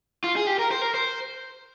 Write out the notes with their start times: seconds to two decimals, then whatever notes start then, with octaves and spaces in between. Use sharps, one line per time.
0.24 F4
0.36 G#4
0.47 G4
0.59 A#4
0.71 C5
0.82 A#4
0.94 C5